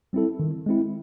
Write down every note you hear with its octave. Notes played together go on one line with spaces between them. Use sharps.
G3 C4 E4 A4
D#3
G#3 C4 E4